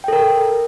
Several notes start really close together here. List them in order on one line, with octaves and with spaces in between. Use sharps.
G5 A4 A#4